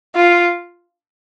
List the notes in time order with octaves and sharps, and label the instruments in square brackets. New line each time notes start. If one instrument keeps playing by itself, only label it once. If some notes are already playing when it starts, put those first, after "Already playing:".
[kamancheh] F4